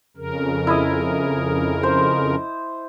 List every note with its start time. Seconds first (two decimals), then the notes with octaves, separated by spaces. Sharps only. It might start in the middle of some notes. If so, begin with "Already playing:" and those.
0.17 F2 C#3 A#4
0.67 E4 D#5
1.83 C5